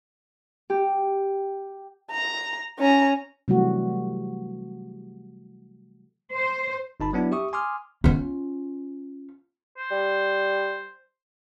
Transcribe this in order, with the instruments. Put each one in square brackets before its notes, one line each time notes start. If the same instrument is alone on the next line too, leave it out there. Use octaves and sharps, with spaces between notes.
[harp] G4
[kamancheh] A#5
C#4 A#5
[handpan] C3 E3 F#3 G3 A3 F#4
[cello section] C5
[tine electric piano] G1 D#4 A5 B5
F#3 B3 D4 E4
G4 E5 C#6 D#6
G#5 C6 D6 D#6 F6
[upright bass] C#4 F4
[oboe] C5
[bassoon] G3